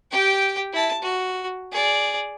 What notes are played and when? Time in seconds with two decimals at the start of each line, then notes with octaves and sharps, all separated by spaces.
0.11 G4 G5
0.73 E4 A5
1.02 F#4
1.72 G#4 D5